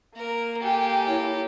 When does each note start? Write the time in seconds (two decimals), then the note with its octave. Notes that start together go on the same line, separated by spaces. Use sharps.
0.16 A#3 A#4
0.62 G4 A4 G5 G#5
1.08 E4 C#5